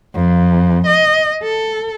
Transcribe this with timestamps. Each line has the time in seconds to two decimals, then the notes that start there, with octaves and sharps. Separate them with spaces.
0.15 F2
0.87 D#5
1.43 A4